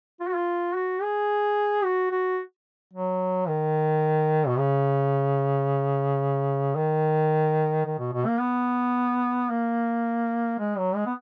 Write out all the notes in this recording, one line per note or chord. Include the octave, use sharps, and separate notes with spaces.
F4
F#4
F4
F#4
G#4
F#4
F#4
F#3
D#3
B2
C#3
D#3
D#3
B2
B2
A#3
B3
A#3
G#3
F#3
G#3
B3